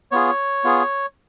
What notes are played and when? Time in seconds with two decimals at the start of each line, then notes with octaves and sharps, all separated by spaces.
0.11 B3 F4 G#4 C#5
0.64 B3 F4 G#4